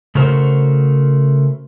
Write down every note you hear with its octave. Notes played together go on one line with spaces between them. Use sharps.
C#3 A3 F#4 A#4 C5